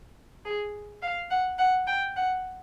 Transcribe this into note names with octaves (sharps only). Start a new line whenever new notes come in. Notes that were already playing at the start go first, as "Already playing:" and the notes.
G#4
F5
F#5
F#5
G5
F#5